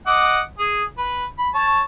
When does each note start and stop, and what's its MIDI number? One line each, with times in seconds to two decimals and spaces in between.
0.07 0.40 75
0.07 0.40 78
0.07 0.40 86
0.59 0.83 68
0.98 1.25 71
1.38 1.49 83
1.54 1.81 73
1.54 1.81 81